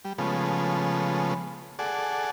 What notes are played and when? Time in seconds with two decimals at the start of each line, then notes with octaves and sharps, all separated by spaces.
0.05 G3
0.18 C#3 F3 G#3 A3 B3
1.79 G#4 A4 D5 F#5